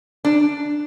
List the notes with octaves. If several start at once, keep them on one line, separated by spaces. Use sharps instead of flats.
D4